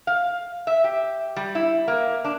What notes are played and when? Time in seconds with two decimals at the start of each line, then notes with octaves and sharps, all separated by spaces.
0.07 F5
0.67 E5
0.84 G4
1.36 G3
1.55 E4
1.88 A#3
2.24 D4